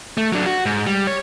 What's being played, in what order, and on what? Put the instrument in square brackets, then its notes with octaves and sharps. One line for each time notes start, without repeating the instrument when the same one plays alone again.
[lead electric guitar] A3
F#3 D4
F#4
G#2
G3
C#5